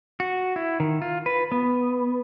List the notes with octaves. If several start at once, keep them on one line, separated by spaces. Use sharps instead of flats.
F#4
E4
D#3
F4
B4
B3